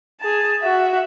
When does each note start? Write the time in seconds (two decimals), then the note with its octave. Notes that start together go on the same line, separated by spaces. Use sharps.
0.20 G#4 A5
0.61 F#4 E5